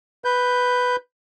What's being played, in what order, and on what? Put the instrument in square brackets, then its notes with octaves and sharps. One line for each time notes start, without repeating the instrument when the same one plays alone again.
[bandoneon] B4 G6